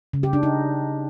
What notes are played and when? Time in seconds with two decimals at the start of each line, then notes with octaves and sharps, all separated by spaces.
0.13 C#3
0.23 G4
0.33 D4
0.43 D#4